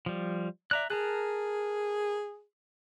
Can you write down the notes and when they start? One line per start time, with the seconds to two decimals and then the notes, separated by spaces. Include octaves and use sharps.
0.06 F3 G3
0.71 D5 E5 A#5 F#6
0.90 G#4 A#4 A5 F#6